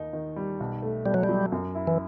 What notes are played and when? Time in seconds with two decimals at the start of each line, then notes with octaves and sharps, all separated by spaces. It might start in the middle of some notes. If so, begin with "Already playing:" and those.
Already playing: D#2 D#4
0.13 D#3
0.36 G3
0.60 B1
0.82 A3
1.06 B2 G3
1.14 F#3
1.24 G3
1.29 F#3
1.52 F#2
1.75 E4
1.87 E3